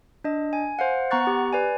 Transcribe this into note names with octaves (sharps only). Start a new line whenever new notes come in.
D4 D#5
G#5
C5 F5 F#5
B3 F#5 A#5 C#6 F#6 A6
G4
B4 D5 G#5